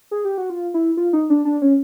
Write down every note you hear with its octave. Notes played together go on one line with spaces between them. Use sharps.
G#4
G4
F#4
F4
E4
F4
D#4
D4
D4
C#4